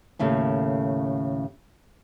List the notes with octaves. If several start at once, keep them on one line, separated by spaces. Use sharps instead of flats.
D#2 A2 C#3 A3